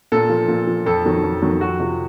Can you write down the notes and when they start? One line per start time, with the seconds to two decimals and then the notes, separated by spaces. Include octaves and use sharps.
0.12 A#2 A4
0.30 F3
0.48 A#2
0.67 F3
0.86 F2 A4
1.05 D#3 F#3
1.23 F2
1.42 D#3 F#3
1.61 F2 F#4
1.80 C3 F3